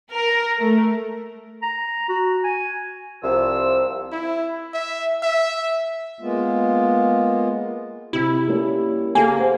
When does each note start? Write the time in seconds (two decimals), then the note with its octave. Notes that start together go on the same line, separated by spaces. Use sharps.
0.11 A#4
0.59 A3
1.62 A#5
2.09 F#4
2.44 G#5
3.22 C2 C3 F3 E6
4.12 E4
4.74 E5
5.23 E5
6.18 G#3 A#3 B3 F4
8.13 C3 E4 B5 E6
8.48 G3 A#3 C#4
9.15 C#3 A#3 G4 A4 G#5
9.39 C5 F#5